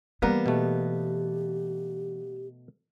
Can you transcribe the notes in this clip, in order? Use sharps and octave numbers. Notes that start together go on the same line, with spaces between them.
E3 G3 A#3 B3
B2 A3 G4